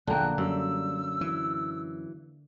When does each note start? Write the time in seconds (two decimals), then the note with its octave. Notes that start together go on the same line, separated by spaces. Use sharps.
0.07 A#1 E2 D3 A#3 G5 F#6
0.38 F#2 G3 E6
1.21 E3